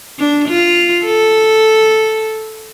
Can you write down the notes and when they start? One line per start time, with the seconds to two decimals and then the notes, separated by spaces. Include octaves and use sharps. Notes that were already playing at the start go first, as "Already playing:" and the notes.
0.19 D4
0.49 F4
1.05 A4